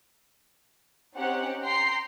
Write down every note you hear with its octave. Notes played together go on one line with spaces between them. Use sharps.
C4 C#4 D#4 G4 F#5
G5 A#5 C6 C7